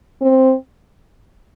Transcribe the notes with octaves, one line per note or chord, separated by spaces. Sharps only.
C4